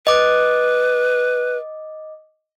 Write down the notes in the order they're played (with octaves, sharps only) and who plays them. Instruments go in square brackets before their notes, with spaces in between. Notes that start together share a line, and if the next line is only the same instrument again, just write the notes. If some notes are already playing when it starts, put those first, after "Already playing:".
[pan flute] B4 [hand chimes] D#5 D6